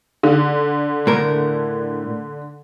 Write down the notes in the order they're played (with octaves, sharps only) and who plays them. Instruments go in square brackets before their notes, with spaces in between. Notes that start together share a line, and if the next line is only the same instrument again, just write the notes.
[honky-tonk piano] D3
[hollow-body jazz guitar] A2 A#4